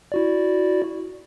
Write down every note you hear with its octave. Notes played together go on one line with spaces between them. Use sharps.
E4 F#4 D5